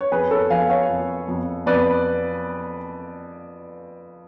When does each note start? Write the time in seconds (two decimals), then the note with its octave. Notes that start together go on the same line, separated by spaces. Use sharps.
0.01 C#5
0.12 F2 G#4 B4
0.31 A4 C#5
0.50 F3 F5 G#5
0.70 C#5 F5
0.90 F2
1.28 F2
1.66 F2 B4 D5